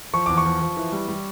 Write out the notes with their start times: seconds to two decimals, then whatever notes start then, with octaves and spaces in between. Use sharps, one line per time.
0.14 F3 C#6
0.26 E2 D6
0.37 C#6
0.46 F3
0.62 F3
0.77 E3
0.92 G3
1.08 G3